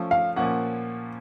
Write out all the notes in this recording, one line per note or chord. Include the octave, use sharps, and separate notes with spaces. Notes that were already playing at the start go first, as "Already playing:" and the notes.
Already playing: F3 A3 C#4 F4
F5
A#2 F3 A#3 C#4 F#5